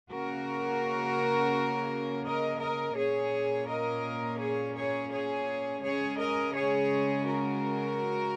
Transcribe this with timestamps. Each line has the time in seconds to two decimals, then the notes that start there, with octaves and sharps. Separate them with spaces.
0.11 C#3 A#3 C#4 F#4 A#4
2.25 A#4 D#5
2.61 A#4 D#5
2.96 A#2 A#3 C#4 G#4 C#5
3.68 A#4 D#5
4.40 G#4 C#5
4.75 G#4 C#5
5.11 G#4 C#5
5.83 C#3 G#3 C#4 G#4 C#5
6.18 A#4 D#5
6.55 G#4 C#5
7.25 F#4 A#4